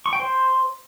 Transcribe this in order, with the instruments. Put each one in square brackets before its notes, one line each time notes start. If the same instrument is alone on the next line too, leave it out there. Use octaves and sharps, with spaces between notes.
[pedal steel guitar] C#6
G5
C5